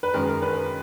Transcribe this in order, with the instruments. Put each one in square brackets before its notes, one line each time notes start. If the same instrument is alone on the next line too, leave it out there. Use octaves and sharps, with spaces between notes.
[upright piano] B4
F#2 D#3 G#3 A#4
A#4
B4